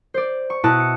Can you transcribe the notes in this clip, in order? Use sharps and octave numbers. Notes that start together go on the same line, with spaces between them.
C5 D5
C#6
B2 E4 D#5 A5 F#6
C#7